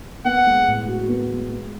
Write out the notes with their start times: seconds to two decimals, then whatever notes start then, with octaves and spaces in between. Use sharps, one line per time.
0.25 B3 F#5
0.47 G#3
0.67 A2
0.87 F#4
1.08 B3
1.29 G#3
1.49 G#3